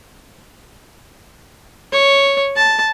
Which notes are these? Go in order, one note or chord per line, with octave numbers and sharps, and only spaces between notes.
C#5
A5